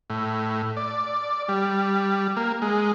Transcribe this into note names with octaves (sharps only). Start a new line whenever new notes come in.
A2
D5
G3
A#3
G#3